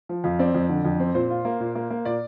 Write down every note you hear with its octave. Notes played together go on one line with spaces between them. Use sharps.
F3
F2 F5
C4 D5
F2
D3
F2
C4
A#2 C5
F4
A#3
A#2
A#3
A#3
A#2 D5